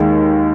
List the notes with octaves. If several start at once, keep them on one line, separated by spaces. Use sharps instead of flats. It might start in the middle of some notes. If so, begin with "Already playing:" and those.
Already playing: D#2 D#3 G#3